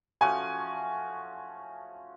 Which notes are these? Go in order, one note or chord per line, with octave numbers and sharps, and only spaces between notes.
F3 A3 C#4 F#4 G#5